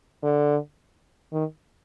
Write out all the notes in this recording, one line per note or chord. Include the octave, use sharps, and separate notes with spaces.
D3
D#3